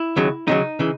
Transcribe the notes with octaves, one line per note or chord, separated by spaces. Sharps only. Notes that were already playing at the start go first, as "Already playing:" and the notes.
Already playing: E4
D#2 C#3 F#3
D#2 C#3 F#3 D#4
C#3 E3